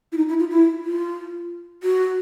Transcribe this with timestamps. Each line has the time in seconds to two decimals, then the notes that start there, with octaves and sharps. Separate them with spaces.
0.12 E4
0.17 D#4
0.29 E4
0.39 F4
0.51 E4
0.84 F4
1.83 F#4